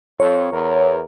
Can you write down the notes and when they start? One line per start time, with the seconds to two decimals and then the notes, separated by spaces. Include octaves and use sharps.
0.20 F2 C#5
0.52 E2 A#4